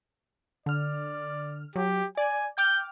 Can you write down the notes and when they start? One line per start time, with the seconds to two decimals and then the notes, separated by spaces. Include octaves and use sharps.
0.66 D3 D5 F6
1.76 F#3 G4
2.17 D5 G#5
2.58 G5 D6 F6 G6